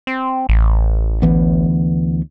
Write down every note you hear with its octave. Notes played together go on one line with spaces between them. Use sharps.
C4
A1
D2 E3 B3